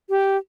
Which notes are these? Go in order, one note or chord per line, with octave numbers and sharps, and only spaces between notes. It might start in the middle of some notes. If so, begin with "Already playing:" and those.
G4